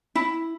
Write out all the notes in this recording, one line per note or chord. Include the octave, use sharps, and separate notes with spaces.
E4